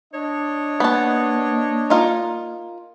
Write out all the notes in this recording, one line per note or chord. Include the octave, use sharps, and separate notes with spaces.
D4 C#5 D#5
A#3 B3 A5
D#4 F4 A#4